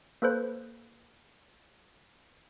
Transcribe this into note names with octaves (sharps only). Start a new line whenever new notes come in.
A#3 A4 B4 C5